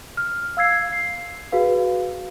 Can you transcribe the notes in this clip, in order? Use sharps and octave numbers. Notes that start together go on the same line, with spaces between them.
F6
F5 E6 G#6 C7
C7
F#4 G#4 B4 F5